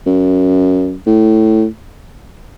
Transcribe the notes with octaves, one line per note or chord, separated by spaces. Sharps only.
F#2
A2